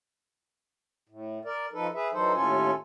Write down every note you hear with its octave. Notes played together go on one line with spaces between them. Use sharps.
A2
A#4 D5
F3 D#4 A4 B4
G#4 B4 E5
E3 F#3 D#4 A4 C5
D#2 A2 C#4 F4 A4 G#5